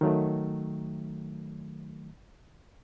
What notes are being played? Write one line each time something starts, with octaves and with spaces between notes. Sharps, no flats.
D#3 F#3 A3